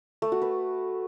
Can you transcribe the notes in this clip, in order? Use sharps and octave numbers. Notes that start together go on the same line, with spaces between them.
A3
F#4
B4